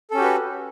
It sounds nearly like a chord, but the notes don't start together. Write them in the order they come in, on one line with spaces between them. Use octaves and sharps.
A4 C#4 G4 F#4 B4